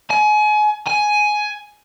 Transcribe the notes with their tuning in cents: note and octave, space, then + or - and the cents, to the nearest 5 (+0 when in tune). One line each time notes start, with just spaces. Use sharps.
G#5 +30
G#5 +10